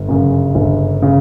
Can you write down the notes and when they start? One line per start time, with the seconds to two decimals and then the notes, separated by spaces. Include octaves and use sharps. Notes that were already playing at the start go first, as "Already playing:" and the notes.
Already playing: G1
0.08 F#2 C#3
0.55 G1
1.02 C#3